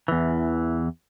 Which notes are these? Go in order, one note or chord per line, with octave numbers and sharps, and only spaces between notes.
E2 E3